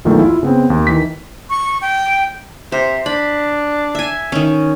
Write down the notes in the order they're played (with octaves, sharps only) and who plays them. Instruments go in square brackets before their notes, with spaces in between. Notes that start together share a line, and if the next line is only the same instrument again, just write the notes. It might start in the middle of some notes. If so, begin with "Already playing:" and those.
[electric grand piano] B1 E2 A#2 D#3 E3 A3
E4 F4
C#3 B3 C4
D#2
D#3 E3 B6
[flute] C#6
G5
[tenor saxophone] C3 [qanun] C5
[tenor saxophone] D4 [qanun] B5
[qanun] E5 G#5
D#3 C#4